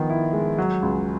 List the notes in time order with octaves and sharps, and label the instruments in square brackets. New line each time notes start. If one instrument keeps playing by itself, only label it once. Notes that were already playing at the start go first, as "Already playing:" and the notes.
Already playing: [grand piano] D#3 F3 B3
E4
G#3
F#3
C#2